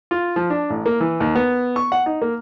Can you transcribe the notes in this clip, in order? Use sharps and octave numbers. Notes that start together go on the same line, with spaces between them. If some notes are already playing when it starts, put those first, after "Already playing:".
F4
F3
D4
A1
A#3
E3
D#2
B3
C#6
F#5
D#4
A#3